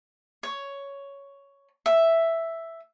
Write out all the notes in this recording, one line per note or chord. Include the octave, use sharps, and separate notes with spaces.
C#5
E5